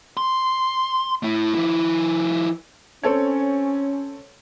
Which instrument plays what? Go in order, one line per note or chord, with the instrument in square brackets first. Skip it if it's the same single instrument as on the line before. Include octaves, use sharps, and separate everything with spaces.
[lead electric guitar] C6
A3 E4
F3 E4
[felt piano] C4 A4 C#5 [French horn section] C#4